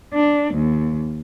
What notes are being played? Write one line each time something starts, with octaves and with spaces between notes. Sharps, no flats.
D4
D#2